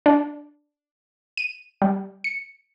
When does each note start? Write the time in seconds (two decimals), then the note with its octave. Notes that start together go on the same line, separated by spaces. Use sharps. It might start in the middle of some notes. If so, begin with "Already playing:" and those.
0.06 D4
1.37 D#7
1.82 G3
2.24 C#7